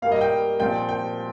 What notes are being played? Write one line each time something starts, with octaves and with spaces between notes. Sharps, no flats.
G2 G3 A#3 F5
D#5
G5
A#2 F3 C4 G5
G5